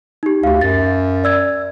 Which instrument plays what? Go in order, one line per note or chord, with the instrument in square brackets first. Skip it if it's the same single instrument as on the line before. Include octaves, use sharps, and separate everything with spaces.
[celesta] D#4 G4
[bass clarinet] D2 [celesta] G4 F5
[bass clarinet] F#2 [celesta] A6
[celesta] D5 E6 G#6